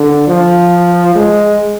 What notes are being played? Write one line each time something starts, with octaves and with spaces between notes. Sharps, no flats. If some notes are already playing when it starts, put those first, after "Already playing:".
Already playing: D3
F3
G#3